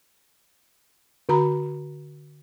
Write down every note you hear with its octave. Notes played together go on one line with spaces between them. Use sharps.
D3 F#4 A#5 B5